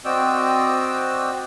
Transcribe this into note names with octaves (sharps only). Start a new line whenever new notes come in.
C4 F#4 D5 D#5 G5 E6